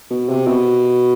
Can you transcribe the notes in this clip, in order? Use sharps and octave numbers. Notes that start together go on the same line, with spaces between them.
B2
C3
B2